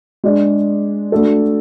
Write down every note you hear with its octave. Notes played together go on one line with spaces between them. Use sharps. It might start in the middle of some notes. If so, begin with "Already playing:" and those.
G#3 D4 G#4 D5
A3 D4 F#4 A4